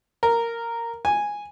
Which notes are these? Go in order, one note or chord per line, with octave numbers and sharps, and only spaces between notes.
A#4
G#5